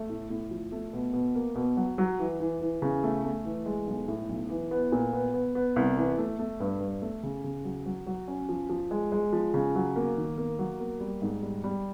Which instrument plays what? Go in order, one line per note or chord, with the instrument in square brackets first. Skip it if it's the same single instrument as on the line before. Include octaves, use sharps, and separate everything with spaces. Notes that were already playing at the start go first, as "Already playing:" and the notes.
Already playing: [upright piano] A3
A2
A2
F3
A3
B2
B2
A#3
B2
F#3
F#3
E3
E3
E3
C#3
A3
A3
E3
G#3
B1
A2
B1
E3
B3
A#2
B3
B3
B3
C2
E3
A3
A3
G2
G2
A3
C#3
C#3
F#3
F#3
F#3
C#4
F3
F3
G#3
G#3
F3
C#3
F#3
A#3
D#3
A#3
F#3
A#3
G3
G#2
G3
G3